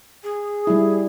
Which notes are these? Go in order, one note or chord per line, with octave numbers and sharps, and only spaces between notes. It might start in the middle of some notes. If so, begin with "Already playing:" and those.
G#4
G3 E4